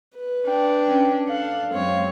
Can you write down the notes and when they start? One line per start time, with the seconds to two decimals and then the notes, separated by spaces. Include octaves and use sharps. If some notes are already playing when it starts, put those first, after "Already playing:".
0.15 B4
0.47 D4 G5
0.88 C#4
1.29 D4 A4 F5 F#5
1.72 F#2 G#3 C4 C#5